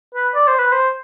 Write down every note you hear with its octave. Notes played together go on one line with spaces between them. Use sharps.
B4
D5
C5
B4
C5